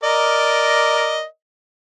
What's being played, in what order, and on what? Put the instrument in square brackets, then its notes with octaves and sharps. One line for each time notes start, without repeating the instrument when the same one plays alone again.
[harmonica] A#4 D5 D#5